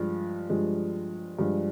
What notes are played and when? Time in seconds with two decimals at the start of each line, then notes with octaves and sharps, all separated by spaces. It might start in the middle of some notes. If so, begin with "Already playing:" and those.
Already playing: G2 F3 G#3
0.50 G2 F3 G#3
1.39 G2 F3 G#3